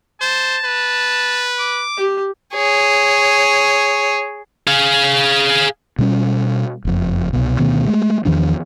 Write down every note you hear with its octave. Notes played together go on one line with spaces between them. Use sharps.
C5 A5
B4
D6
G4
G#4 C#5
G#4 F5
B2 G3 C#4
F#1 F2
C2 B2
D2 B2 D#3 B3
G#3 A3
E2 D#3 F3 D4